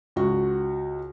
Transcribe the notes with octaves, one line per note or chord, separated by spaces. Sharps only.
C#2 F#4